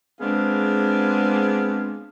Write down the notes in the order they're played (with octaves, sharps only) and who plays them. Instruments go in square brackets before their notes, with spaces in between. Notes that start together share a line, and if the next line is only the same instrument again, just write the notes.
[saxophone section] G#3 B3 C4 D4 G#4 F5